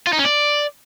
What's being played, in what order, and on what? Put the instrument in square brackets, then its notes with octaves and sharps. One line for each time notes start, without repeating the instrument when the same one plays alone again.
[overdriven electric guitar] F4
D#4
C#4
D5